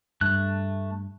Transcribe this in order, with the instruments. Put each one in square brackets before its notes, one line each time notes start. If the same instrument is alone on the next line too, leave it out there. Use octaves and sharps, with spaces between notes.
[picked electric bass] G2 [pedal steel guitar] A3 F#6